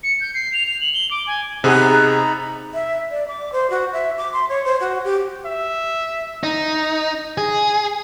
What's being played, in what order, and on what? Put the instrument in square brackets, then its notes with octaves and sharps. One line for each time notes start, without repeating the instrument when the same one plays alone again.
[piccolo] C#7
G6
C7
F7
F7
F#7
G7
D6
G#5
[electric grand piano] C3 [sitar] B3 G#4 [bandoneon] D#4 A#5 B5
[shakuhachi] E5
D5
D6
C5
F#4
E5
D6
C6
C#5
C5
F#4
G4
[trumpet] E5
[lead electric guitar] D#4
G#4